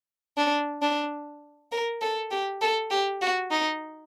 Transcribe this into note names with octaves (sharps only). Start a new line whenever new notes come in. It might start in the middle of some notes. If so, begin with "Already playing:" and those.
D4
D4
A#4
A4
G4
A4
G4
F#4
D#4